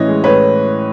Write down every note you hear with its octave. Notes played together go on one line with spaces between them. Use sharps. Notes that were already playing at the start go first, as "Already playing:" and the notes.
Already playing: A2 E3 C#4 C#5 D#5
G#3
A2 B4 C#5